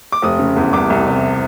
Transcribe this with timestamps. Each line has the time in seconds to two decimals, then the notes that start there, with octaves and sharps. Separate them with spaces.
0.12 D6
0.22 F1 D#6
0.39 C#3
0.56 E2
0.73 C2 D6
0.90 C2
1.06 C3